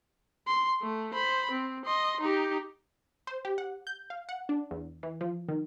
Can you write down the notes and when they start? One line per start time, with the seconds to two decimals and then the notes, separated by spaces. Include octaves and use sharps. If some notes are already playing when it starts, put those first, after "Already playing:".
0.47 C6
0.82 A3
1.14 C5 B5
1.52 C4
1.86 D#5 C6
2.21 D#4 G4
3.27 C5
3.45 G4
3.58 F#5
3.87 G6
4.10 F5
4.29 F#5
4.49 D4
4.71 E2
5.03 E3
5.21 F3
5.49 D#3